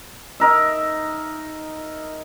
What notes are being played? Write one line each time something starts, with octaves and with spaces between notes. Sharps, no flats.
D#4 A#4 E5